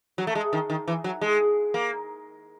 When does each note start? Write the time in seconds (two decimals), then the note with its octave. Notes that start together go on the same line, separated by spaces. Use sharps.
0.18 F#3
0.27 A3
0.35 G#3
0.53 D#3
0.70 D#3
0.88 E3
1.04 F#3
1.21 G#3
1.74 A#3